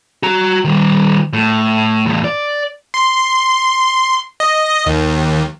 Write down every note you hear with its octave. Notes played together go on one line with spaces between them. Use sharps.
F#4 A#5
D#3 G3
A2
E2 A2
D5
C6
D#5
D#2